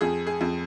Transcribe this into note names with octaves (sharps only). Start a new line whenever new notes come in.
F2 G#4
G#4
F2